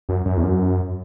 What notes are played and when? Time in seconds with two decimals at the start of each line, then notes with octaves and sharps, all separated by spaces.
0.09 F#2
0.26 F#2
0.37 E2
0.44 F#2